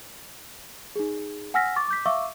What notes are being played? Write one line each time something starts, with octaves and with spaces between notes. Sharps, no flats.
D#4 G#4
F#5 G#5 E6 F6 A#6 B6
C#6 D6 A6
D6 G6 B6
E5 F5 C#6 D6 E6